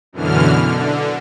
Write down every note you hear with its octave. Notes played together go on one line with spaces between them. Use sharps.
F#2 B2 D3 E3 F6
D3